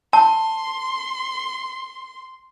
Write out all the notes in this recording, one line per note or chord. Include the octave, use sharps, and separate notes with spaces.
A5 C6